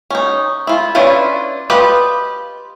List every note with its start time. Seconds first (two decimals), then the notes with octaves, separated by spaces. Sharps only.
0.10 C#4 D#4
0.67 E4 F4
0.95 C#4 D4 E4 F4 B4
1.70 F4 G4 B4 D#5